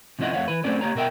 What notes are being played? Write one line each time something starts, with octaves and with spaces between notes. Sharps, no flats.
C3 F3 C#4 E4 D#5 F#5
F2 A3 C#5 F5 F#5
E3 B4
F#3 A3 C4 C#4 A4 D5
A#3 G4 C#5 A#5
B2 A#4 E5 G5